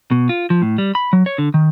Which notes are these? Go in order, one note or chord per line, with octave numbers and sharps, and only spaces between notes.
B2
F4
F3
A2
G3
B5
F#3
C#5
D3
D#3